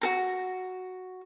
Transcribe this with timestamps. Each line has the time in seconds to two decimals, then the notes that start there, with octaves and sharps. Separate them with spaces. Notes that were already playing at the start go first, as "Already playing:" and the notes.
0.01 F#4 A4 A#5